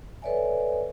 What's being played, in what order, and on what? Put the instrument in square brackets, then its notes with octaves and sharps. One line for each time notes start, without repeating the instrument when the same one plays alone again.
[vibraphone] A4 B4 C#5 D5 E5 G#5